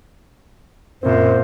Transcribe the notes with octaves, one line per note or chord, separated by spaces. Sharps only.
F#2 A#2 C4 C5